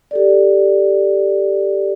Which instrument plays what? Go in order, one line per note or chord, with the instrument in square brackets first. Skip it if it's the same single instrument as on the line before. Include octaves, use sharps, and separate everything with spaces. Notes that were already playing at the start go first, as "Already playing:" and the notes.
[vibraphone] G4 A4 D5